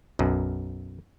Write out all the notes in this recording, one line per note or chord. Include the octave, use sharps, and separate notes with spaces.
B1 F#2